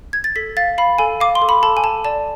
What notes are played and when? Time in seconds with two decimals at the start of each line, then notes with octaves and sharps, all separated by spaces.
0.13 G#6
0.24 A6
0.36 A4 B6
0.57 F5 A6
0.78 F5 B5
0.99 A4 G#5
1.21 F5 D6
1.35 C6
1.42 A4
1.49 B5
1.63 A4 A5
1.77 G#5
1.84 A4 A5
2.05 D5 A5